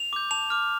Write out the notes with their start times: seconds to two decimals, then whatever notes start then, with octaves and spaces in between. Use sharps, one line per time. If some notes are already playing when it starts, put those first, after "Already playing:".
Already playing: F7
0.13 D6 G6
0.31 A5 F7
0.50 D6 F6